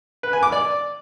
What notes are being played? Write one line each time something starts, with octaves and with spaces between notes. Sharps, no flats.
B4
G#5
D6
D5